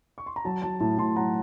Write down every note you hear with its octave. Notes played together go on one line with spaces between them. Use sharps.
C#6
C6
A#5
F#3 A5
F#3 A5
A2 A5
A2 A5 C6
F#3 F#5 A#5